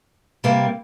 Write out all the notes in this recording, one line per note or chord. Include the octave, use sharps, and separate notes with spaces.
C3 G3 A#3